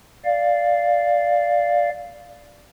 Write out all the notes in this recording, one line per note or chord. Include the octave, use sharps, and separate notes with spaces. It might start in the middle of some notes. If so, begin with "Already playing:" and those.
D5 F5